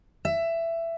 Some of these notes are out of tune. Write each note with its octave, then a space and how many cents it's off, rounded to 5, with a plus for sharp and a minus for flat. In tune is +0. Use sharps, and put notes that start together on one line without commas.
E5 +15